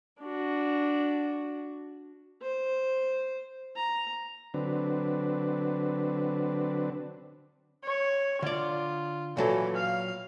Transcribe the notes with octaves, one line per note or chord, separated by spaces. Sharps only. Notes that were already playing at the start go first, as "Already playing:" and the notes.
D4 F#4
C5
A#5
D3 F#3 C4 D4 B4
C#5
D3 F4 D5
A#2 E3 F#3 A4
F5